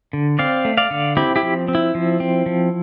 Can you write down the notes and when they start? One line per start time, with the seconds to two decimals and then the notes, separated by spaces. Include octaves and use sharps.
0.13 D3
0.39 C4 D5 F5
0.65 A3
0.77 D5 F5
0.91 D3
1.17 C4 E4 G4
1.36 E4 G4
1.43 F3
1.68 C4
1.75 E4
1.95 F3
2.20 C4
2.46 F3